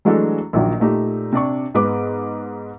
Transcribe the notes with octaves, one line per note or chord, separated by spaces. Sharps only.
E3 F#3 G#3 A3 D4 A4
A#1 A#2 D#3 F#3
A#2 A3 D#4 G4
C3 D4 D5 C#6
G#2 G#3 B3 B4 D6